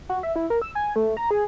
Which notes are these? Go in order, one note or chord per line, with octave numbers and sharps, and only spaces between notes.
F#4
E5
E4
A#4
E6
G#5
A3
A#5
G#4